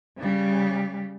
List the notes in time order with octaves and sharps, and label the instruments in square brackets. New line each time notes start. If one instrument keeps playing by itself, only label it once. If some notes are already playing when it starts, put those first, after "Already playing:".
[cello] C#3 G3